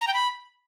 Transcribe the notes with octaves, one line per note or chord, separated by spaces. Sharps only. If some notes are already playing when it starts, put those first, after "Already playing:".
A#5
G5
B5